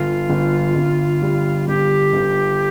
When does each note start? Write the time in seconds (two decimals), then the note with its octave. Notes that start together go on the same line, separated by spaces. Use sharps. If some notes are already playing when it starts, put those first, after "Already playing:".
Already playing: G1 F4
0.30 G1
0.75 G1
1.22 G3
1.68 G1 G4
2.13 G1